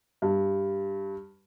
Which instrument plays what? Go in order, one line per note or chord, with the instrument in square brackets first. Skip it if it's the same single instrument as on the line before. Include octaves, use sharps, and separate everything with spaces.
[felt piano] G2